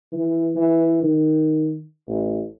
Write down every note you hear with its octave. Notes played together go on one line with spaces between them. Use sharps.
E3
E3
D#3
A1